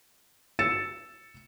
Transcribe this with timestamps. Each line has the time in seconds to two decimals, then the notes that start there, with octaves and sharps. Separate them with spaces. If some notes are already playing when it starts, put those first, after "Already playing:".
0.59 E6 A6 C#7 E7